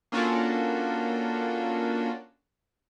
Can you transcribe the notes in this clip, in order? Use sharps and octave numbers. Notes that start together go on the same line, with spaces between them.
A#3 C#4 D4 F4 F#4 A4